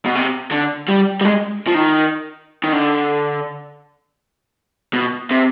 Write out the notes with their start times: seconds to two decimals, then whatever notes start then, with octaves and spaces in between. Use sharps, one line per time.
0.06 B2
0.15 C3
0.52 D3
0.89 G3
1.21 G3
1.25 G#3
1.68 F3
1.75 D#3
2.64 D#3
2.73 D3
4.93 B2
5.30 C3